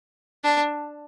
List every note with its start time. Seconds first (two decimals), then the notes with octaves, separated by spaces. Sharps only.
0.44 D4